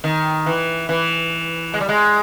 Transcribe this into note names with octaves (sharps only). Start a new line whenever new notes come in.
D#3
E3
E3
G#3
G3
G#3